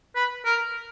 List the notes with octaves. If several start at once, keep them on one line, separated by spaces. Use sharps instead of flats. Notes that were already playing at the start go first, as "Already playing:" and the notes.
B4
A#4